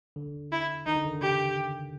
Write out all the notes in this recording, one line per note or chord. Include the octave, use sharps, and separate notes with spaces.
D3
E4
D#3 D#4
D3
D#3
D3
C#3 G4